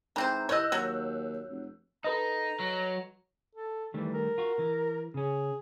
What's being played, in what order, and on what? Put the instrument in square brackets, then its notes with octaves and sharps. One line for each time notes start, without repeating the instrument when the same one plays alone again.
[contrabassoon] G#2 [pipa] E3 C4 C5 [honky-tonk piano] A#5
[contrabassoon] E3 [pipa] C#5 D#5 [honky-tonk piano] E6 F#6 G6
[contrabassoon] D#2 [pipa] F#3
[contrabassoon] F1
[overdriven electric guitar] D#4 [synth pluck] A4 B4 D#5 [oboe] A#5
[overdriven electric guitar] F#3
[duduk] A4
[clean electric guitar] D#3 G3 A3 [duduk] E3
[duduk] A#4
[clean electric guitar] F4 F#4
E3
[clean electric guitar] C#3 C#4 [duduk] G#4